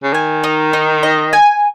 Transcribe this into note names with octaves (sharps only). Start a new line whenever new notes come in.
C#3
D#3 G#5
D#4
D#4
D#5
G#5